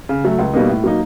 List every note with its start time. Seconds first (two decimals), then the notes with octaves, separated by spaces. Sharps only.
0.09 C#3
0.25 F#3 A3
0.39 C#2
0.54 B2 G3 A#3 D#4
0.69 A2
0.84 F#3 A#3 D#4